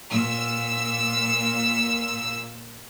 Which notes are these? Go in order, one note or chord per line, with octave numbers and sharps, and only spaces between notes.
A#2 E6